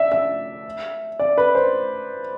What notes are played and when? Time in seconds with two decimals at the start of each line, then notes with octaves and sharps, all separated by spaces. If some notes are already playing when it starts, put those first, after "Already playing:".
Already playing: D5 E5
0.12 E5
1.19 D5
1.38 B4
1.55 C5